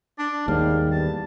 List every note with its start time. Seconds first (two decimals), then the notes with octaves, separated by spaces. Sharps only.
0.19 D4 D5
0.48 D#2 G#2 G3 F5
0.92 E2 A5